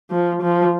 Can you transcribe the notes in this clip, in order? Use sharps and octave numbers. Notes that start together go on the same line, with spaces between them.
F3
F3